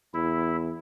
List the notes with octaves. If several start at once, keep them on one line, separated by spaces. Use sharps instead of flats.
E2 E4